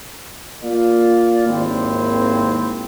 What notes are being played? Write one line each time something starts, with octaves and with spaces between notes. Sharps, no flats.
A#3 F4 A#4 D5 F5
G#1 D#2 A#3 C4 E4